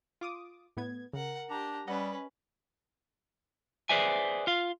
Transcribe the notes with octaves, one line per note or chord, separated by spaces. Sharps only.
F4 D6 D#6
A2 B3 G#6
C#3 A#4 F#5
D4 G4 A#5
G3 C#4 B4 D#5 F#5
G#4 B4 C5 D5 E5 G#5
F4 F5